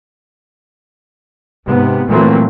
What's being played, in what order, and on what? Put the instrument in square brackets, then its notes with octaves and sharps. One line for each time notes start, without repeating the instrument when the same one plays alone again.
[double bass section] G#2 C3 B3
A#2 E3 F#3 A3 A#3 C4